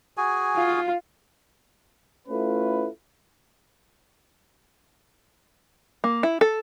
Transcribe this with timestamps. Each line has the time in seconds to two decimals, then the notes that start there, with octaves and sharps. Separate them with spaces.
0.17 F#4 G#4 G#5
0.56 F4 F5
2.28 A3 C#4 E4 F4 A4 B4
6.04 A#3
6.23 E4
6.41 A4